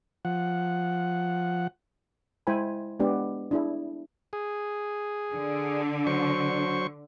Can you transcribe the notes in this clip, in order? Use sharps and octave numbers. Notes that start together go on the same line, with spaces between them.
F3 F#5
G#3 E4 C5 G5 G#5 B5
G#3 B3 D4 G4 D5
D4 E4 G#4
G#4
D3
F#3 C5 C#6